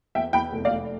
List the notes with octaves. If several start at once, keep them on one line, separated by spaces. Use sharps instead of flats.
E2 E5 G5
E2 G5 B5
F1
D5 F5
F1